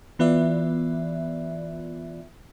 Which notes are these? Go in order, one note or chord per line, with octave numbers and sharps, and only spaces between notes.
E3 B3 F4 D5 E5